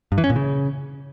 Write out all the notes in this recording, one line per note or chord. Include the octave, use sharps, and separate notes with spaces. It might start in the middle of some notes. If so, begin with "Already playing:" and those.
G2
E3
C#4
A#2
C#3